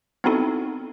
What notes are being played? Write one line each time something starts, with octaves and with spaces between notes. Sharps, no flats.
B3 C4 D#4 E4 F#4 A4